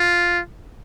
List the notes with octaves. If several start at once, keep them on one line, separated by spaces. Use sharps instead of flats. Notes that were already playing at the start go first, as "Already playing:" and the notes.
Already playing: F4